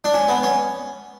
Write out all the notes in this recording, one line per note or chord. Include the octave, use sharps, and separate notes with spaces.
D4
C#4
B3
C#4